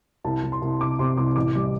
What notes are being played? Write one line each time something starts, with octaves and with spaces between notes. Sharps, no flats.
C2 A5
C2
C6
C2
C3 D6
C3 C6
C2 D6
A1 D6
G3